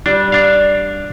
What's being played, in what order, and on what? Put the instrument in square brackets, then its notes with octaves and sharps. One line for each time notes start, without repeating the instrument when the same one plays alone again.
[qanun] G3 [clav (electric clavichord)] D4
[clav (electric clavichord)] D4 F5